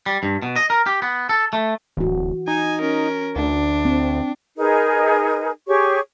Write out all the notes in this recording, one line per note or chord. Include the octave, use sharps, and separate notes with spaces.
G3
G2
B2
D#5
A#4
G4
B3
A4
A3
D1 E3 F#4
D#4 G#5
C#4 A#4
D2 D4
C4
D#4 G#4 A#4 B4
G4 G#4 C#5 C#6